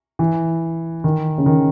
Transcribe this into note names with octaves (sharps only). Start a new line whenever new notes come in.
E3
D#3
C#3
D#3